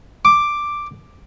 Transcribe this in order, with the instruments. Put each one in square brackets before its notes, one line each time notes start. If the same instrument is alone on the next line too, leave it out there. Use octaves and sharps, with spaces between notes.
[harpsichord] D6